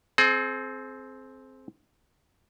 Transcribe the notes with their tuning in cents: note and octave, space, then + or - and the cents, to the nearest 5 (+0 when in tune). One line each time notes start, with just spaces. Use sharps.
C4 +0 G#4 +40